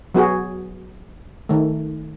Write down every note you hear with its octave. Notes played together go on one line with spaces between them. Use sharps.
F#3 B3 F#4 G#4
D#3 A3